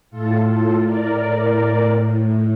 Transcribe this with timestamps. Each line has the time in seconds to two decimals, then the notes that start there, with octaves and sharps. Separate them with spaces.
0.11 A2 F4 A4
0.48 F4 A4
0.84 A#4 D5